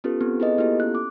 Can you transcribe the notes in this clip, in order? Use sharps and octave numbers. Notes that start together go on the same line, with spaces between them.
B3 C#4 F4 G4 A4 B4
B3 C4 A4
E4 G#4 B4 D#5
A#3 B3 E4 F4 G4 A4
C#4 F#6
D6